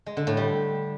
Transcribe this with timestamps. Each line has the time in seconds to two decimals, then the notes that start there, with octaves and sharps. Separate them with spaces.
0.06 G#3
0.17 D3
0.27 A2
0.37 G3